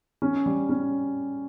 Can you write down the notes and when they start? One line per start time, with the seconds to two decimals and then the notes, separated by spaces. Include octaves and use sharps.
0.22 C#4
0.46 G3
0.69 C#4